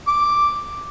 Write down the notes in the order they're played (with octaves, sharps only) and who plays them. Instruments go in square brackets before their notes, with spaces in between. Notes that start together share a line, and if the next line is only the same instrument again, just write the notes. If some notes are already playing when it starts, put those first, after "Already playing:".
[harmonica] D6